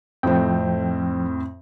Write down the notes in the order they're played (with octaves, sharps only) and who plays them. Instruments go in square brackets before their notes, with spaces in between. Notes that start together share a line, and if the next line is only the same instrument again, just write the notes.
[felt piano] F2 A2 C4 [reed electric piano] F3 G5